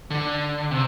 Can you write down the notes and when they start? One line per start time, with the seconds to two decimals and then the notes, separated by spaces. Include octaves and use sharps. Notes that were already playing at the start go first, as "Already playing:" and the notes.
0.10 D3
0.71 C3